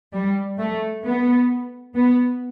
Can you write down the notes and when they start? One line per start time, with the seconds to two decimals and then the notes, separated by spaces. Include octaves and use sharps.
0.13 G3
0.58 A3
1.04 B3
1.95 B3